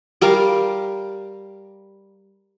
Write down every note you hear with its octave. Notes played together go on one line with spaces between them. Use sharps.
G3 G4 A#4 F5